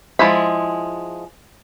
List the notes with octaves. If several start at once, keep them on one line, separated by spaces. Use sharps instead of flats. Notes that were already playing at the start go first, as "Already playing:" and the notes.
F3 G#3 E4 B5